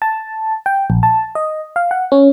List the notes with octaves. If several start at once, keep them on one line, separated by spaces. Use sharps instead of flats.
A5
G5
A#1
A5
D#5
F5
F#5
C#4